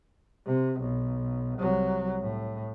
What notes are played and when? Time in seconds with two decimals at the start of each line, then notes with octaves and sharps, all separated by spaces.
0.46 C3
0.80 B1
1.59 C2 F#3
2.22 A2